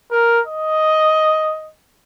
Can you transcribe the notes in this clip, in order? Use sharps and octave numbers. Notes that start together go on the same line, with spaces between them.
A#4
D#5